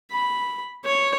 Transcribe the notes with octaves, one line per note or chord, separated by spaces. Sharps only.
B5
C#5